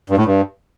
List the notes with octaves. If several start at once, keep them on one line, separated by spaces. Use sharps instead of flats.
G2
A2
G2